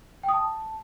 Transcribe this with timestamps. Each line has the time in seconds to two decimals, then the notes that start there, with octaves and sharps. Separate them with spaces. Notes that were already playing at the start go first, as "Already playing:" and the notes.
0.23 G5
0.28 D#6
0.34 A5